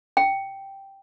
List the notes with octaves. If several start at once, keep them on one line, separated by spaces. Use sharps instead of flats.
G5